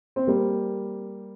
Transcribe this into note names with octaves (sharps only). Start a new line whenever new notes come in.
C4
G3 A#3